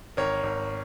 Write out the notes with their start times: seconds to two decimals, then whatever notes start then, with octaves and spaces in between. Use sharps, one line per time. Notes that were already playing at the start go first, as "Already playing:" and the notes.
0.17 G#1 A#4 C#5
0.43 G#1